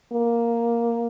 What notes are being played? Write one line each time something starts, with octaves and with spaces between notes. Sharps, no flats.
A#3